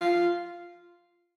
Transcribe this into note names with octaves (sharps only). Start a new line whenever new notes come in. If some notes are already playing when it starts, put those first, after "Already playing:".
F4